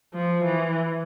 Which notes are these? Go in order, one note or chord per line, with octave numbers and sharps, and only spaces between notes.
F3
E3